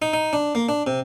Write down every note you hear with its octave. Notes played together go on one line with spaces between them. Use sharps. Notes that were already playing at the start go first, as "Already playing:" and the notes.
D#4
D#4
D4
A#3
D4
C3